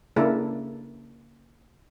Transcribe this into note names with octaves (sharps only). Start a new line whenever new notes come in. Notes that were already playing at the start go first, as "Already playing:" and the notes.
C#3 A#3 D4 E4 A4 A#4